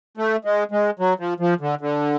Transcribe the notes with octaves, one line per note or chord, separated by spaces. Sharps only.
A3
G#3
G#3
F#3
F3
F3
D3
D3